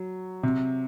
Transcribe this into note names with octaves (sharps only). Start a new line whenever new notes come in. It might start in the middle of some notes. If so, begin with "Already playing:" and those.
Already playing: F#3
C3